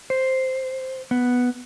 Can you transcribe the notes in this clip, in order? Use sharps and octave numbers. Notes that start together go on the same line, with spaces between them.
C5
B3